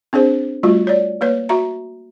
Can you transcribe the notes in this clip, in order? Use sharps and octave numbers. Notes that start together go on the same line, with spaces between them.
C4 D4 G#4 C5
G3 A3 F4 F#4
C#5 D5
A#3 B4 C#5
F#4 E5 A#5